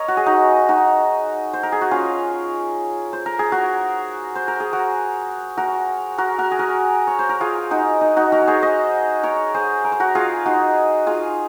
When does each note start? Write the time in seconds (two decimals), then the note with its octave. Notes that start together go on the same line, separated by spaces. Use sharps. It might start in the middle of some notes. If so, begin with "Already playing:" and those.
Already playing: A#4 C#5 D#5
0.08 F#4
0.17 G#4
0.26 D#4 F#4
0.69 D#4 F#4
1.53 C5
1.63 A#4
1.72 G#4
1.81 F#4
1.91 C#4 F4
3.13 C5
3.26 A#4
3.39 G#4
3.52 F#4 A#4
4.35 C5
4.48 A#4
4.60 G#4
4.73 F#4 A#4
5.58 F#4 A#4
6.18 F#4 A#4
6.38 F#4 A#4
6.52 G#4
6.59 F#4 A#4
7.07 C#5
7.19 C5
7.29 A#4
7.41 F4 G#4
7.71 D#4 F#4
8.01 D#4
8.17 D#4 F#4
8.32 F#4 A#4
8.42 C#5
8.47 G#4 C5
8.62 C5 D#5
9.23 A#4 C#5
9.54 G#4 C5
9.85 A#4
9.92 C5
10.00 F#4 A#4
10.15 F4 G#4
10.46 D#4 F#4
11.07 F4 G#4